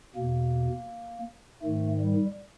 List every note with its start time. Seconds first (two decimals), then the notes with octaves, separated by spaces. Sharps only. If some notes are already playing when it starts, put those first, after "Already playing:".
0.16 E2 B2 A#3
1.62 G#2 D#3 A3
2.00 G3